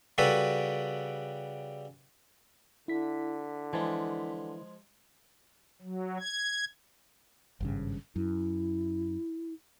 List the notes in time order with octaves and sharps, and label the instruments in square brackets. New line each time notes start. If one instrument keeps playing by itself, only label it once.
[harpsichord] C#3 G3 F#4 A4 B4
[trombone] D3 [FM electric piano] E4 B6
[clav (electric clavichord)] E3 G#5 A5 [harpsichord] F3 G#3
[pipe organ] F#3
G#6
[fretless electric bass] G#1 G2 C#3
[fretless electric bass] F#2 [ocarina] E4